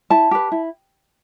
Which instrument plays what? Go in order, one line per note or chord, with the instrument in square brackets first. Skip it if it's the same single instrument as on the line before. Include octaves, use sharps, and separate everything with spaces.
[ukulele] E4 A5
G4 B4
E4